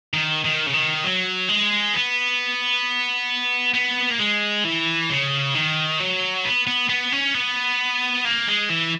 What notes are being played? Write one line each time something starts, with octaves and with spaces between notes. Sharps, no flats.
D#3
D#3
C#3
D#3
F#3
G#3
B3
B3
A#3
G#3
E3
C#3
D#3
F#3
B3
B3
B3
C#4
B3
A#3
G#3
E3